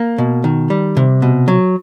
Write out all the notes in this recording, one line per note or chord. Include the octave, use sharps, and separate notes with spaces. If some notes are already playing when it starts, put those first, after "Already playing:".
Already playing: A#3
B2
D#3
G3
C3
B2
F#3